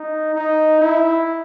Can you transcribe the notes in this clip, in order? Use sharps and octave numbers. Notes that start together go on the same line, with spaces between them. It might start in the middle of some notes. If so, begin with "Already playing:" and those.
Already playing: D#4
D#4
E4